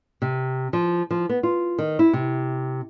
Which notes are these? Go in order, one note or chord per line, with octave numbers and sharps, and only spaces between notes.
C3
F3
F3
B3
F4
D#3
E4
C3